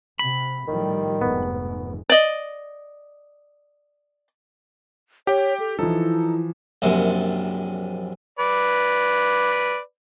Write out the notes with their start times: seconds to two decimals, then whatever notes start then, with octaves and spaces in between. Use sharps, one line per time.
0.19 C3 B5
0.68 A2 D#3 F3 G3
1.21 F1 G#2 B3
2.10 D5 D#5
5.27 G4 C#5 G5
5.60 A4
5.79 E3 F3 D#4 E4 A4
6.82 A#1 F#2 C3
8.39 B4 D5